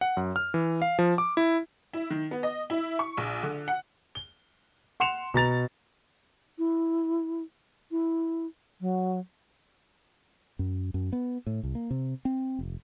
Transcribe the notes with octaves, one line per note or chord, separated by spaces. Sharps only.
F#5
F#2
F6
E3
F5
F3
D6
E4
E4
D#3
B3
D#5
E4
C#6
A#1
D3
F#5
G7
F#5 C6 C#7 E7 F7
B2 A#5 A6 F7
E4
E4
F#3
F#2
F#2
B3
A2
C2
A#3
C3
C4
F1